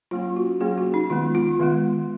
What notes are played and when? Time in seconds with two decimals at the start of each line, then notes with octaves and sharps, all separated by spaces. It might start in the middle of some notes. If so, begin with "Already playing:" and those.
0.11 F#3 A#3 C#4 F4
0.36 F#4
0.61 F#3 A#3 C#4 G#4
0.78 F#4
0.94 D#4
1.10 D#3 G#3 B3 F4
1.35 F4
1.59 D#3 G#3 B3